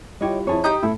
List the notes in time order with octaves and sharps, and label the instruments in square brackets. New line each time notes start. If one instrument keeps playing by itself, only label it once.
[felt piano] G3 E4 F4 [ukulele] G4 C#5 D#5
[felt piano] F2 A5 [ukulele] E4 G#4 C#5
[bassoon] D#4 [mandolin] G4 D#6 G6 [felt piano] A#5
[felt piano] A2 A3 [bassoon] E4 [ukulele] A4